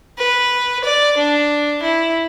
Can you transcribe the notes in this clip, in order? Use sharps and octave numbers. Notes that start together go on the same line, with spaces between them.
B4
D5
D4
E4